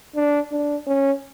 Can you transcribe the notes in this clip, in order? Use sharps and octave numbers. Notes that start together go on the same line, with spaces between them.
D4
D4
C#4